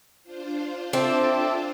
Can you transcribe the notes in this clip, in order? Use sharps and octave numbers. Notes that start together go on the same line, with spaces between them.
D4 F4 C5
C4 A4 D5 E5